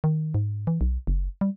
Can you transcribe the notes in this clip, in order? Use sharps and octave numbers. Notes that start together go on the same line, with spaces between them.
D#3
G#2
E3
B1
F#1
G3